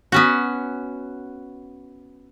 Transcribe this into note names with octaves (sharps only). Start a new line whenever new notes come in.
B3 C#4 F#4